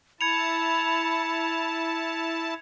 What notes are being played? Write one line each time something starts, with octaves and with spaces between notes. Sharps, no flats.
E4 A5 B5 G#6 C#7 F7